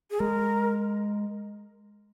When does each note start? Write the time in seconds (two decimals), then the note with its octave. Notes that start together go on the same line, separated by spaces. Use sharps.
0.11 G#4
0.20 G#3 A#4